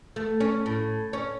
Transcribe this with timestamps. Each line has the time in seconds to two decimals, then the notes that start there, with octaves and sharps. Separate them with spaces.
0.16 A3
0.40 C#4
0.66 A2
1.13 C#4